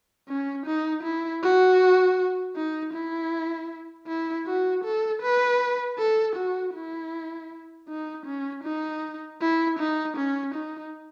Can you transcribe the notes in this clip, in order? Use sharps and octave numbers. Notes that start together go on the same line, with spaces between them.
C#4
D#4
E4
F#4
D#4
E4
E4
F#4
A4
B4
A4
F#4
E4
D#4
C#4
D#4
E4
D#4
C#4
D#4